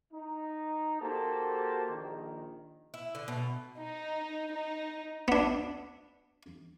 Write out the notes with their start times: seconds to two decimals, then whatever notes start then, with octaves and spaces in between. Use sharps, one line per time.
0.13 D#4
1.02 A#3 F#4 G4 A4 C5
1.90 A#1 D#3
2.94 E4
3.15 D3
3.28 B2
3.78 D#4
4.52 D#4
5.28 B3 D4